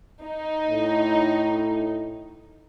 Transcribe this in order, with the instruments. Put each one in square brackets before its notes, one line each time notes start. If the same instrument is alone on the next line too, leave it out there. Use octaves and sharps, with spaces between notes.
[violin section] D#4
[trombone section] A2